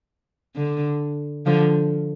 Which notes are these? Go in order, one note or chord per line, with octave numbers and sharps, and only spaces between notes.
D3
D3 F3